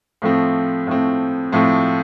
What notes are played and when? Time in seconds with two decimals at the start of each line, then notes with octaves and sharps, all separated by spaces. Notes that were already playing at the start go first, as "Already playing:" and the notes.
0.22 A2 F3 A3 C4
0.87 A2 F3 A3 C4
1.53 A2 F3 A3 C4